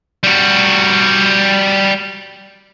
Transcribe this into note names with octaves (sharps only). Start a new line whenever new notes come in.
G3 F#4